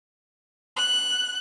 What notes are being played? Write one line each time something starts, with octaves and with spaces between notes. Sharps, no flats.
F#6